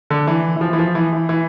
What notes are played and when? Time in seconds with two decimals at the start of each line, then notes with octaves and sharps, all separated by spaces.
0.10 D3
0.27 E3
0.56 E3
0.61 F3
0.73 E3
0.79 F3
0.95 E3
1.13 E3
1.29 E3